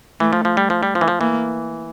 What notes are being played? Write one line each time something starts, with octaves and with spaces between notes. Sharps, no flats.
E3 A3
F3
F3
G3
F3
G3
F3
E3
F3
E3 A#3